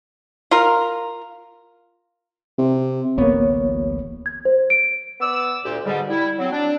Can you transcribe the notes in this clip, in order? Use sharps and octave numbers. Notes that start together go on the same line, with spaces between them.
F4 A#4
C3
D1 A1 A#3 B3 C#5
G#6
C5
D7
B3 D5 D6 E6
D2 A#2 G4
G#2 B2 D3 G3
G3 E4
F#3 C4
D4